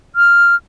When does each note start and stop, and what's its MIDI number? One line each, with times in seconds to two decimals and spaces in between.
0.16 0.55 89